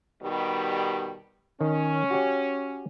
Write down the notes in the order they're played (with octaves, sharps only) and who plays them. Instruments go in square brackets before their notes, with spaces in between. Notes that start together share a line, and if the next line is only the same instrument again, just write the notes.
[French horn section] B2 D#3 G3
[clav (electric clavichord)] D#3 [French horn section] C#4
[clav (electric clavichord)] F#4 G4 C#5